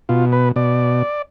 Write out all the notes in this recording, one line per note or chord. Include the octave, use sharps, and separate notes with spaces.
B2 F4
B4
B2 D5